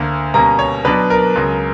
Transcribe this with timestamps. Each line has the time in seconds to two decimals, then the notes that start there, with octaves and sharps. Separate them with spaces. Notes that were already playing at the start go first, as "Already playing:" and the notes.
Already playing: D2 D3 A#3
0.34 B2 G3 A#3 C#4 A#5
0.59 C#5
0.85 B2 F#3 B3 D4 B4
1.10 A#4
1.35 C#2 C#3 F#3